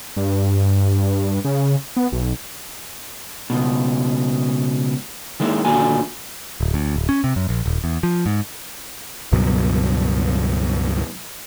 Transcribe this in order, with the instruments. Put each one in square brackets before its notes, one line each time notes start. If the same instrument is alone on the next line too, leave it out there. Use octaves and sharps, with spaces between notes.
[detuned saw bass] G2
C#3
B3
B1
[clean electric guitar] C#2 B2
D#3 G#3 A#3 E4
A#2 D3 D#3 A#3 F#4 G#5
[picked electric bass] D1
D2
D1
C#4
C3
F#2
A#1
D#1
E2
F3
G#2
C#2 G2 B2 F#3